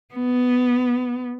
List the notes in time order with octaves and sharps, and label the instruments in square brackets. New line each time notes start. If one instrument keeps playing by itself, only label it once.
[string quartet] B3